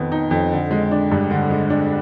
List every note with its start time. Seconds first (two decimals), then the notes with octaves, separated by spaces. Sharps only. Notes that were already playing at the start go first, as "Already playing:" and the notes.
Already playing: F2 D#3 B3
0.12 D#4
0.31 F2
0.51 D3
0.71 G#3
0.91 D4
1.11 G2
1.31 D3
1.50 G#3
1.70 D4